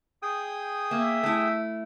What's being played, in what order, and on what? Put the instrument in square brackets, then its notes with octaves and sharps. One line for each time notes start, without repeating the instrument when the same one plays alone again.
[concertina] G#4 G5 D#6
[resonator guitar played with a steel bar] A#3 [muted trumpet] E5
[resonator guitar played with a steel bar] A3 E4